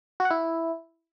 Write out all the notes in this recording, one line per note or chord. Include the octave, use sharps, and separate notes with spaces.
F#4
F#5
E4